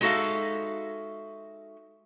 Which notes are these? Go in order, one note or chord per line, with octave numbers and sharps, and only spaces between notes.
G#3 D#4 F#4 A4 E5 F5